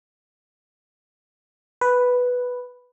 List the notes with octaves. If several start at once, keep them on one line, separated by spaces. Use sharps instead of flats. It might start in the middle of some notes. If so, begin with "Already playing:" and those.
B4